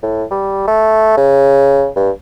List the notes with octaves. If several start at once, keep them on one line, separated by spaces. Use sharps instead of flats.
A2
G3
A3
C#3
G2